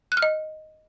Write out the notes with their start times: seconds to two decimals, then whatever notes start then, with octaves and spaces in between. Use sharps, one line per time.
0.12 F#6
0.17 F6
0.22 D#5